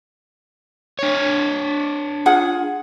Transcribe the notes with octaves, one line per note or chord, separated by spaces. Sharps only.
D4 C#5
F4 G#4 F#5